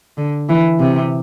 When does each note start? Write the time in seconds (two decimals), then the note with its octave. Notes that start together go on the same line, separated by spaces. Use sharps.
0.17 D3
0.49 E3
0.80 C3